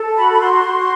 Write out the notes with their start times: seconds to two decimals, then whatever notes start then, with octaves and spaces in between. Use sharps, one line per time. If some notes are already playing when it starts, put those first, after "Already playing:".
Already playing: A4
0.17 F#4 B5
0.32 B5
0.40 F#4 C6
0.65 F#4